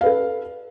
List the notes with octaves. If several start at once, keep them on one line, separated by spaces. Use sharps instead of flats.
A4 B4 F5